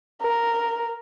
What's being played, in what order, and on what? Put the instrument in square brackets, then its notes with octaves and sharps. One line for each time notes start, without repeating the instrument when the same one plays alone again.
[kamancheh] A#4